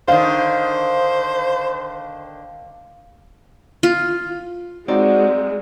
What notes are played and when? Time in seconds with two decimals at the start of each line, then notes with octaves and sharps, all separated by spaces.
0.08 D3 D#3 C5 F5
3.83 F4
4.88 G#3 C4 D#4 F4 F#4 D5